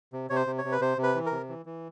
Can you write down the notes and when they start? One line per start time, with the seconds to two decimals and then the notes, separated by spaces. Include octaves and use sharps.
0.13 C3
0.30 C3 C#5
0.36 C5
0.47 C3
0.58 C#5
0.65 C3
0.72 B4
0.81 C3 C5
0.98 C3
1.03 B4
1.15 E3
1.26 A#4
1.32 C3
1.49 E3
1.66 E3